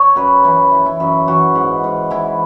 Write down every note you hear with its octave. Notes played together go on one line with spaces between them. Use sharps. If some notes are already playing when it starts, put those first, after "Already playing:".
Already playing: C#5
F#2 B4
E3 B4
E3
E4
F#2
E3 F#4
G#2
G#2
E3 E4